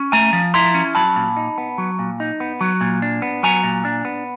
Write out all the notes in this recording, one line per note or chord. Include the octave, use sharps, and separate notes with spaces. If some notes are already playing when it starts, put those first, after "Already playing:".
Already playing: C#4
A3 G#5 A#5
F3
E4 A#5 C6
C#4
F#3 A5 B5
A#2
D#4
B3
F#3
A#2
D#4
B3
F#3
A#2
D4
B3
F#3 G#5 A#5
A#2
D4
B3